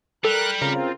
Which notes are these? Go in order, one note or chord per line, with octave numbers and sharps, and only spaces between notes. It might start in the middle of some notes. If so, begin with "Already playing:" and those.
G3 A4 A#4 F#6
C#3 C4 F4 A#4